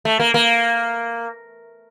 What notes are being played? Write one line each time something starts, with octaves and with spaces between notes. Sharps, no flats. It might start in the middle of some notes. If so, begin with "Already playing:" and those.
A3
A#3
A#3